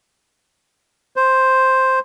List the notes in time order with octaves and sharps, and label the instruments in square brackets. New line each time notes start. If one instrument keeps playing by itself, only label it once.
[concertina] C5